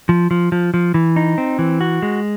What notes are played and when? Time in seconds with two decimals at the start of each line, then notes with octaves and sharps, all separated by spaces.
0.09 F3
0.31 F3
0.52 F3
0.74 F3
0.94 E3
1.16 D#4
1.38 C4
1.59 E3
1.81 F#4
2.02 G#3